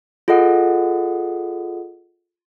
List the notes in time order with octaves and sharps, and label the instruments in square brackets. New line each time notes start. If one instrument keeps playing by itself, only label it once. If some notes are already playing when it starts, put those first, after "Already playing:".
[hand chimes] F4 G#4 A4 D#5 F#5 D#6